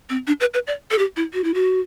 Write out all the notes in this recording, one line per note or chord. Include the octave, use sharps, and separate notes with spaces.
C4
D4
B4
B4
D5
A4
G4
E4
F#4
E4
F#4